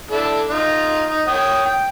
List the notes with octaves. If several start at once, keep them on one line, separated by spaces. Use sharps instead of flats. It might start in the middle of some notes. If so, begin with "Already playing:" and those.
D4 E4 A4
D#4 F4
D#4
C#5 G5 D#6
G5